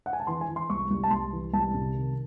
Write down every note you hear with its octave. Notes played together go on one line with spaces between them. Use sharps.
F#5
G#5
A5
E3 C6
G#5
E3
C6
C2 C#6
C2
A5
C2 C6
E3
C2 A5
C3
D#3